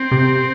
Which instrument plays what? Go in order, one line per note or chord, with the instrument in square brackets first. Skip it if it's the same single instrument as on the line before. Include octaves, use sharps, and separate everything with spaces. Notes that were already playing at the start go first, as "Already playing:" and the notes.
Already playing: [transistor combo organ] C4
[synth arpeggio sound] C3